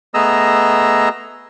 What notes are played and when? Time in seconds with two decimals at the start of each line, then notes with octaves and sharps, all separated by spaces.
0.14 A3 B3 G#4 D#5 A#5 E6